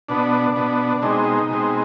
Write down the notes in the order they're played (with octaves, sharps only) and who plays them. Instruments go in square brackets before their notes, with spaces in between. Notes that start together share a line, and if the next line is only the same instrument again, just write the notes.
[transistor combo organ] B2 B3 D4
B2 B3
B2 G#3 C4 D#4
B2 G#3 C4